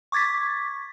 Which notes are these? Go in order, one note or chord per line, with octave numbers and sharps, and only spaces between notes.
C#6 D6 G#6 A6 B6